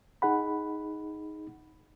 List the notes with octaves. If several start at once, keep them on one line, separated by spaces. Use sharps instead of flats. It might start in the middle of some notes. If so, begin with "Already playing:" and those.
D#4 G#4 F#5 B5